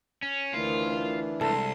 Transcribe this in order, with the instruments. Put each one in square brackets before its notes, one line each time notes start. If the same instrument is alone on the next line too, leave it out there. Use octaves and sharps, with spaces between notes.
[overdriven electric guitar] C#4
[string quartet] D2 D#3 C5 [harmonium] E3 D4 E4 [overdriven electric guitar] F4
[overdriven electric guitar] C2 [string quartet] G#3 C6 [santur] A4